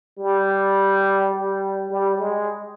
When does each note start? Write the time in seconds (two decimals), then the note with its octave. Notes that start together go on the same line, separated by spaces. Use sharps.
0.19 G3
1.34 G3
1.91 G3
2.19 G#3